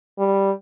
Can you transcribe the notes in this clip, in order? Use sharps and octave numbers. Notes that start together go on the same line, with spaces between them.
G3